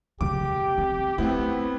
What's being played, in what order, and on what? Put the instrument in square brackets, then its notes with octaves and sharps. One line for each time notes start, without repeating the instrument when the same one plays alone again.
[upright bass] C#3 B3 [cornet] G4 [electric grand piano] D6
[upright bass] C4
[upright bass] A3 [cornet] B3 [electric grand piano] C4 E4